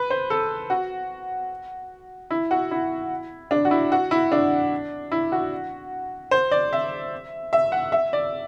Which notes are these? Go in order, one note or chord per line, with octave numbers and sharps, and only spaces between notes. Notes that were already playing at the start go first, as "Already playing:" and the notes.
Already playing: B4
C5
A4
F#4
E4
F#4
E4
D4
F#4
E4
F#4
E4
D4
E4
F#4
C5
D5
E5
E5
F#5
E5
D5